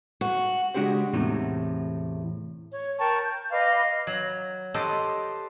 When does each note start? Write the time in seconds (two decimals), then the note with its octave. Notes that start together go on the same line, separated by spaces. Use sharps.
0.21 F#4
0.74 C#3 G#3 D4 F#4 G4 C5
1.13 E2 A2 C3 A3 D#4
2.72 C#5
2.99 A#4 G5 A5 C#6
3.25 G6
3.51 B4 D#5 F5 D6
4.07 F#3
4.74 G4 A4 B4 C5 D#5 G5